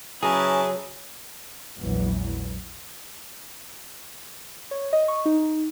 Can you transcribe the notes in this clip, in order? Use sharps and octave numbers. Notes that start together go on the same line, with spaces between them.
C#3 F#3 C#4 E4 G#4 B4 A5 A#5
A#1 E2 E3 F#3 G#3
C#5
D#5
C#6
D#4